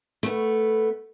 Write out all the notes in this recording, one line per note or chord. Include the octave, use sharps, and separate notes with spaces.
A3 B3